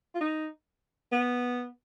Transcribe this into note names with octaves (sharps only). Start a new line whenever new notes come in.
F4
D#4
B3